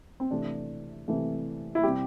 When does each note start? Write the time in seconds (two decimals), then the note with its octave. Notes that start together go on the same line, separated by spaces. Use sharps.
0.20 C4
0.31 C3 E3 A3 D4
1.08 C3 E3 A3
1.75 E4
1.83 C3 G3 G4